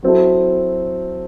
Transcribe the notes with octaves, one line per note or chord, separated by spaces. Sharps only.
F#3 C4 E4 A4